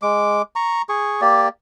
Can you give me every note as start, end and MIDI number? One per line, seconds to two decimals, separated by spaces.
0.02 0.42 56
0.02 0.42 86
0.56 0.82 82
0.56 0.82 85
0.89 1.21 68
0.89 1.21 85
1.22 1.48 58
1.22 1.48 67
1.22 1.48 74